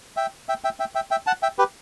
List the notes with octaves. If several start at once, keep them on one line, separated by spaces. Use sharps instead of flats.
E5 G5
E5 G5
E5 G5
E5 G5
E5 G5
E5 G5
F#5 A5
E5 G5
G4 B4